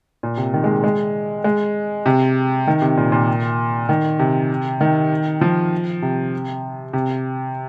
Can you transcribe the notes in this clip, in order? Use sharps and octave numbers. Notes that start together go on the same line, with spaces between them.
A#2
C3
D#3
G#3
G#3
G#3
C3
D#3
C3
A#2
A#2
D#3
C3
D#3
F3
C3
C3